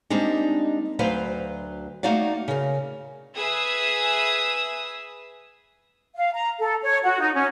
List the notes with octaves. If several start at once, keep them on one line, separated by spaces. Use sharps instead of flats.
G3 G#3 A#3 C4 D4 D#4
D2 F#3 B4 C5 F5
A3 A#3 D#4 F#4 D5 F5
C#3 A#4
G#4 B4 E5 G#5 D#6 E6
F5
A#5
A4
C#5
F#4
D#4
C#4